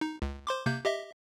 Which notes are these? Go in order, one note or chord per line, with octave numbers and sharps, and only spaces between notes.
D#4
C#2
C5 C6 D6
C3 A#3 G6
G4 D#5 E5